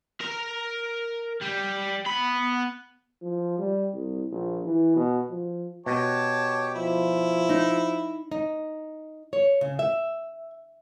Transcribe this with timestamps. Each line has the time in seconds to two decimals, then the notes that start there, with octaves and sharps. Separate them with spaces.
0.21 A#4 A#5
1.42 G3
2.06 B3 B5
3.22 F3
3.58 G3
3.93 C2
4.31 A#1
4.65 E3
4.96 B2
5.30 F3
5.86 B2 G4 C#5 A5
6.75 F3 E4
7.49 D#4
8.32 D#4
9.33 C#5
9.61 C#3
9.79 E5